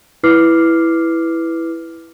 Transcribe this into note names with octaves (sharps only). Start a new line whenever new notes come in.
E4 B4 D6 F6 C7